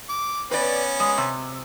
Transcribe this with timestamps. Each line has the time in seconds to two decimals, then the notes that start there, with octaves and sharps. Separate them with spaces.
0.09 D6
0.51 B3 C#4 B4 D5
1.00 G#3
1.18 C3